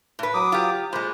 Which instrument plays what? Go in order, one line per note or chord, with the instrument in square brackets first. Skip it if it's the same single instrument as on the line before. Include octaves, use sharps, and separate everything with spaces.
[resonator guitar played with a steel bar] A2 B4
[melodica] F#3 D6 D#6
[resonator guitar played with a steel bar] F4 G4
[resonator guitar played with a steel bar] A#2 G#3 [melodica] C5 B5